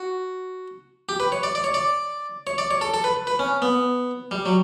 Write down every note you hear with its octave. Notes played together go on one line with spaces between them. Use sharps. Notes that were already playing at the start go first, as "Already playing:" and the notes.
Already playing: F#4
G4
B4
C#5
D5
D5
C#5
D5
C#5
D5
C#5
A4
A4
B4
B4
C#4
B3
G3
F#3